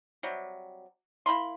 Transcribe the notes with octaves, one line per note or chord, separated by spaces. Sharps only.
C3 F#3 G3
A#3 E4 B5 C6